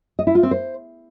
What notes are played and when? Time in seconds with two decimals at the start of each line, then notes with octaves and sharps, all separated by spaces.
0.19 D#5
0.27 E4
0.35 F4
0.43 C4
0.51 C5